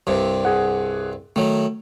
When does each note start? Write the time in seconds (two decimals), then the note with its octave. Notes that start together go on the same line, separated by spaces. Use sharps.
0.07 C2 G2 C3
0.45 G#4 F#5
1.36 D#3 F#3 A3